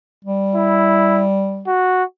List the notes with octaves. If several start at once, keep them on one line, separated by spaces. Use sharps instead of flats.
G3
E4
F#4